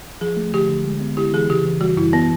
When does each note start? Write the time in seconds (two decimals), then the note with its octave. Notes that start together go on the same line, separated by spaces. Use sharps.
0.21 F3 G#4
0.37 A3
0.53 D3 G4
0.69 D3
0.85 G#3
1.01 B3
1.17 E4 G4
1.34 E3 G#4
1.49 C#3 G4
1.65 E3
1.81 G3 F#4
1.97 F#2 E4
2.13 E3 B3